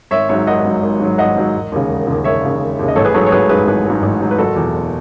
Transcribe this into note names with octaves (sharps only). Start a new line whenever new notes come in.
G#1 C#5 E5
G#2 F#3 C#5 E5
G#1 D#5 F#5
G#2 F#3
G#1
G#2 F#3
G#1 D#5 F#5
G#2 F#3
E1
D#2 C#3
E1
D#2 C#3
E1 C#5 E5
D#2 C#3
E1
D#2 C#3
D#5
A1 A4 C#5
G#4 B4
G#2 F#3 A4 C#5
C#5
A1 G#4 B4
G#2 F#3 G#4 B4
A1 G#4 B4
G#2 F#3
A1
G#2 F#3
B4
F#1 F#4 A4
E2 B2
F#1